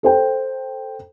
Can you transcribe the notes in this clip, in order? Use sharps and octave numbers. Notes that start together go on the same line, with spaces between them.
A4 C5 G5